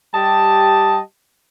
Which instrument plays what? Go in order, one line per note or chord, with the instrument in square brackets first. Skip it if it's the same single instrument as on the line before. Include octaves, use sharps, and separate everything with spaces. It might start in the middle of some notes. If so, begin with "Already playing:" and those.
[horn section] G3 G4 D#5 A5